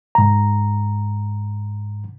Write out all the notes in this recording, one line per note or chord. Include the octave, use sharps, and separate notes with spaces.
G#2 A#5